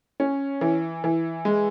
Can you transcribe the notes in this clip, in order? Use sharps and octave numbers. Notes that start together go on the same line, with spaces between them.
C#4
E3
E3
G#3